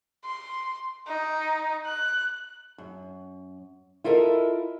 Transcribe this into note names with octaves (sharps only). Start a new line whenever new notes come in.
C6
D#4
F#6
F#2
E4 F4 A4 A#4 D#5